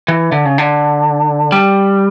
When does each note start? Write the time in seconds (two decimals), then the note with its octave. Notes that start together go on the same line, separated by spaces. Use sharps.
0.08 E3
0.32 D3
0.45 C#3
0.58 D3
1.52 G3